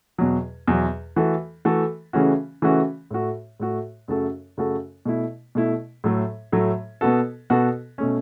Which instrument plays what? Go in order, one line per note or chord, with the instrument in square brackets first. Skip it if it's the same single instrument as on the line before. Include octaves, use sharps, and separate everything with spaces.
[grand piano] E2 B2 F#3
E2 B2 F#3
E3 A3 F#4 A4
E3 A3 F#4 A4
C#3 E3 A3 C#4 F#4
C#3 E3 A3 C#4 F#4
A2 A3 F#4
A2 A3 F#4
F#2 C#3 A3 F#4 A4
F#2 C#3 A3 F#4 A4
B2 A3 E4
B2 A3 E4
A2 F#3 A3
A2 F#3 A3
B2 B3 F#4 A4
B2 B3 F#4 A4
B2 A3 C#4